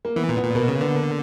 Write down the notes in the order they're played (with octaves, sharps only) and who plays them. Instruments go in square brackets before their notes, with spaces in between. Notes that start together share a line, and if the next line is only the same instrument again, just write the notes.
[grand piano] A#3
[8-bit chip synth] E3 [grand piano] B3
[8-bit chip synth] A#2
[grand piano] B3
[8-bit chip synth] A#2
[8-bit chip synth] B2 [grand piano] A#3
[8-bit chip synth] C#3 [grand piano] A#3
[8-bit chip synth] D3 [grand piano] B3
[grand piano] A#3